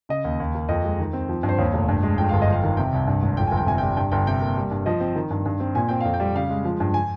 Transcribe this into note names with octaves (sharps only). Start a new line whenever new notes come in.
C#3 D#5
D#2
D#2
A#3
F2 D#5
G#3
D#3
C4
F3
G2
C5
D#2 C#5
F1
G2
G#3
F2 G5
G1 F5
D#5
F2 F5
D#3
C3 G5
C2
G2
G#1
F2 G5
G1 G#5
G5
C3 G#5
G5
G3
G2 G5
G1 G5
C3 G5
A#3
G3
G2
F3 D#5
C4
D#3
G2
G2
C4
A#2 G#5
C4 G5
F2 F5
G5
G3
C#3 F5
G#3
F3
G2
G#5